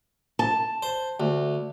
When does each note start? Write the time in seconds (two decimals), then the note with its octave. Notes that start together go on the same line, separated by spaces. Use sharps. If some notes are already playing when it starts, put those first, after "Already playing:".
0.39 A5
0.83 C5
1.20 D2